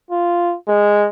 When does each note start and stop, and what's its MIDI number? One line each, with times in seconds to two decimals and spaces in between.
0.10 0.55 65
0.68 1.08 56